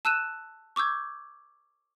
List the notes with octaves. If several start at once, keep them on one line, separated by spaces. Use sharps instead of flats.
A5 E6 F#6 D#7 E7
C#6 D6 E6 G6 G#6